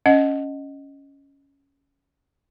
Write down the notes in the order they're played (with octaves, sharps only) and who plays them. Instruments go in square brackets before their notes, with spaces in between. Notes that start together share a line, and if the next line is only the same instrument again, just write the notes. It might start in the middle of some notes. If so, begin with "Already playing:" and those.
[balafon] C#4 D#5 F#5